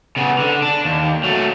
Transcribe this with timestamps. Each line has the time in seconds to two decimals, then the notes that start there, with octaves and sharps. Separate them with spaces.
0.16 C#3 B3
0.39 D3
0.62 D4
0.85 D#2
1.23 F#3 A3